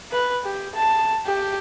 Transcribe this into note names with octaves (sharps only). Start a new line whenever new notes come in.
B4
G4
A5
G4